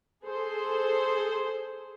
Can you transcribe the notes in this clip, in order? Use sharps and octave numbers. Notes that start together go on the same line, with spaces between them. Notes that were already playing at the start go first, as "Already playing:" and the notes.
G#4 A4 C5